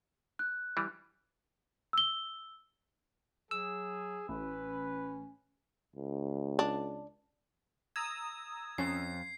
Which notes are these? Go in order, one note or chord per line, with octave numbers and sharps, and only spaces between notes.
F#6
E3 G3
E6 G7
F#3 G#4 E6
A1 C#4 B4
C#2
D4
A#5 D#6 E6 G#6
F2 C#4 C7